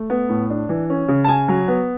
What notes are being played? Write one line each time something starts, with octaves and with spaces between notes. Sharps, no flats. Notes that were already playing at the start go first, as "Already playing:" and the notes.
Already playing: A3
B3
A2
D4
E3
C#4
C#3
A5
C#3 G#5
F#3
B3